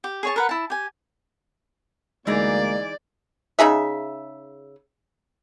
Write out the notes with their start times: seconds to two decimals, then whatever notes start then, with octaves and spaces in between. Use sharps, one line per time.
0.04 G4
0.23 G#4 C#5 A5
0.36 A#4 B4 F#5
0.49 E4 A5
0.70 G4 G#5
2.27 D2 E3 G#3 A#3 D#4 G#4 D5
3.59 C#3 D#4 G#4 E5